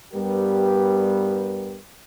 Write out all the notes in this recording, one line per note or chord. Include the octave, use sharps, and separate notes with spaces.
G2 G3 B3 G4 A#4